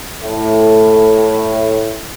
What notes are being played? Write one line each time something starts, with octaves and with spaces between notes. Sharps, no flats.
A2